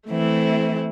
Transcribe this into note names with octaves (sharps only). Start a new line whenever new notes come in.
E3 A3 C4 E4